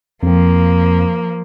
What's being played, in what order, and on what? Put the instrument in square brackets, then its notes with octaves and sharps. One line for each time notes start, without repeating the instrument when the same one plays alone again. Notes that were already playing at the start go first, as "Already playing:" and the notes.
[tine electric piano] F2 C4 [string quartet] F3 A#3